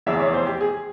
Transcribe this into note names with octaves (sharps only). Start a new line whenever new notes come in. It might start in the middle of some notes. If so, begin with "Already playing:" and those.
F1 E2 E3 E5
C#5
C5
G4
G#4